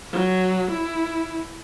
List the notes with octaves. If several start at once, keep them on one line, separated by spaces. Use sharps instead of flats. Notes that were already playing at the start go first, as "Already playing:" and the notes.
F#3
E4